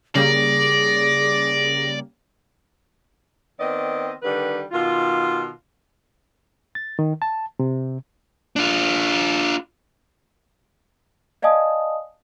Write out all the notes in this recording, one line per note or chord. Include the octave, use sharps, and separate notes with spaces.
C#3 G3 A#3 G#4 D5 A#6
D#3 B3 C4 D5 D#5
D3 D#3 G3 B4
B2 D#3 F4
A6
D#3
A5
C3
D4 F4
D5 D#5 F5 G#5 A5 D#6